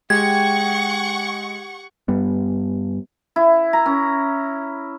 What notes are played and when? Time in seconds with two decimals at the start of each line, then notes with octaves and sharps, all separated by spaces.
0.10 G#3 G4 F#5 C#6 G#6
2.08 G2 G3 B3
3.36 E4
3.73 A#5
3.86 C#4